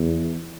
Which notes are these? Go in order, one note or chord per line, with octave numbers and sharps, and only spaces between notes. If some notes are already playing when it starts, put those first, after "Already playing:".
Already playing: E2